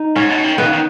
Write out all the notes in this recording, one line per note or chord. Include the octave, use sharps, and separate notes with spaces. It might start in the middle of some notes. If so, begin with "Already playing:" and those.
Already playing: D#4
G#2 C#4
B2
D#3
D#3 B3
C#3
D#3